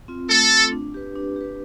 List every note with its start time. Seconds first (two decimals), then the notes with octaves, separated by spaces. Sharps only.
0.08 C4 F4
0.30 A3 A4
0.51 C4 F4
0.72 D4
0.94 G4 B4
1.16 D4
1.36 G4 B4